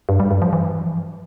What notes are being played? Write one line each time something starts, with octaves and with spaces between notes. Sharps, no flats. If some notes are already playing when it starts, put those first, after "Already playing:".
G2
G3
G2
F3
E3